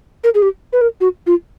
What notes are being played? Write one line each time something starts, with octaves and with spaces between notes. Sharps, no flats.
A#4
G#4
G4
B4
A#4
F#4
F4